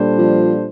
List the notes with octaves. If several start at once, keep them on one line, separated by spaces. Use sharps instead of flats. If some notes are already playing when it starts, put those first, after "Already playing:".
Already playing: A#2 G3 D4 A4 C5
F3